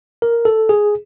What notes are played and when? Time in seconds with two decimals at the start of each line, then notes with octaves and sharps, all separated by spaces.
0.22 A#4
0.45 A4
0.69 G#4